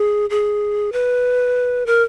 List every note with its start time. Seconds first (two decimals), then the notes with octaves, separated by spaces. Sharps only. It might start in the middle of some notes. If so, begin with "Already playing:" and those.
Already playing: G#4
0.30 G#4
0.92 B4
1.86 A#4